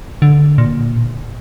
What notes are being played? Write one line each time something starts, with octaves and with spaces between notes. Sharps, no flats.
D3
A#2